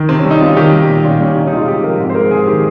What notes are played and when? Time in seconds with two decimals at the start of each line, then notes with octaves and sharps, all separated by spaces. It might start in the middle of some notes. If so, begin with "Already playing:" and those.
Already playing: D#3
0.09 C3 C4
0.19 C#4
0.25 G3
0.31 D#4
0.41 C3 F4
0.57 D#3 G4
0.73 G3
0.89 A#2
1.04 A#2 C#4
1.20 G3 C#4
1.36 C3 D#4
1.47 D#4
1.51 G#3
1.57 F4
1.68 C3 G4
1.84 F3 A#4
1.99 G#2
2.10 C5
2.15 G#3 A#4
2.31 G#2 G#4
2.47 D#3 G4